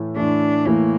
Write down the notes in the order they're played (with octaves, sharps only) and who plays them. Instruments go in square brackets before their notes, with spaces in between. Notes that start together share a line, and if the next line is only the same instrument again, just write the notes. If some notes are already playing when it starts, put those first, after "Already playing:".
Already playing: [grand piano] A2 E3 A3
[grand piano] A2 E3 A3 [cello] D4
[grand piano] A2 E3 A3 [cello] A#3